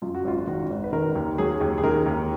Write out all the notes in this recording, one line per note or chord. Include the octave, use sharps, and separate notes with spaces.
F#2 F4
F#4
G#1 F4
D#3 F#4
G#1
B4
D#3 A#4
D#2
F#3 G#4
D#2
G#4
D#3 A#4
D#2